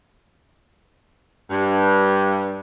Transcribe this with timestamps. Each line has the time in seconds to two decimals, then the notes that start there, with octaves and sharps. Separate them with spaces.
1.51 G2